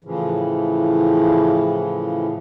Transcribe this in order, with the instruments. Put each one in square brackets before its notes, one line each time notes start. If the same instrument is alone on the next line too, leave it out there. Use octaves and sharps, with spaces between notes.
[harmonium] A2 C#3 E3 F3